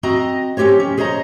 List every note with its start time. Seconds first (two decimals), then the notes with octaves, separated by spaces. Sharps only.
0.03 C4 F#4 D#5 A#5
0.57 C4 C#4 G4 C5 C#5
0.80 C#4
0.97 G#4 C5 C#5 D#5 A#5